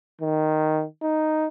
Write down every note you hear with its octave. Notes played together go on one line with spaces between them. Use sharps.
D#3
D#4